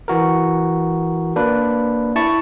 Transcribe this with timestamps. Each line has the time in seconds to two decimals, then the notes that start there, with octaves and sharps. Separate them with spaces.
0.08 E3 F#4 A#4
1.36 A#3 D4 B4
2.16 E4 A5 C#6